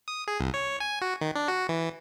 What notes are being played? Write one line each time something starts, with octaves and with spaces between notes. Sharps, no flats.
D#6
G#4
C2
C#5
G#5
F#4
D#3
D4
F#4
E3